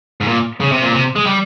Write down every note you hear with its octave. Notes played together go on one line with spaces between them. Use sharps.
G#2
A#2
C#3
C3
A#2
C3
G#3
G3